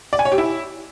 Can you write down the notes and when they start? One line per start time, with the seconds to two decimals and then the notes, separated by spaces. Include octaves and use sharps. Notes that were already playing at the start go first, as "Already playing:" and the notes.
0.13 D5
0.19 G#5
0.25 C#5
0.32 G4
0.38 E4